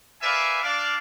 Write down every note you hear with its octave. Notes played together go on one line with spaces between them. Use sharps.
A#4 B4 D5 E5 F5 G#5
D4 D5 F5